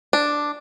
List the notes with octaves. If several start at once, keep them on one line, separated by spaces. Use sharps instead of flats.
D4